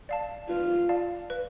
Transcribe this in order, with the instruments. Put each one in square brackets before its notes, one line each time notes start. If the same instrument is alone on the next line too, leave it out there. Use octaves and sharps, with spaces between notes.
[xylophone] D5 F5 A5
[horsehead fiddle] F4 [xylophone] B4
[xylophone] D5 F5 A5
B4